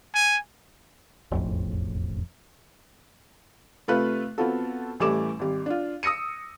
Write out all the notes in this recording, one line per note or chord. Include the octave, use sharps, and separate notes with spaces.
G#5
E1 A1 F2
C3 A3 F4 B4 F#6
B3 C4 F4 F#4 A4
A1 E3 G3 A3 D6 E7
G#1 G3
D4 F4
D#6 E6 A#6 C#7 D#7